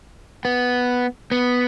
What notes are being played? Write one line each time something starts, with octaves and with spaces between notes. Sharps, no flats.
B3
B3